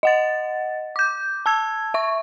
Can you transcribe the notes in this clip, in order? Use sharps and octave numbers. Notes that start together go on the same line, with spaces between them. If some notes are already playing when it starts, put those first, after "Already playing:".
D#5 F#5 A6
D6 G6
A5 E6 G#6
E5 C#6